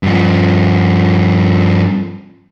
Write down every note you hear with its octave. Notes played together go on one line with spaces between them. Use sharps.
G2 F3